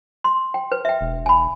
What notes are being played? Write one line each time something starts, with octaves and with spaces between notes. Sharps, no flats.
C6
G5
B4
E5 G5
E1
G#5 B5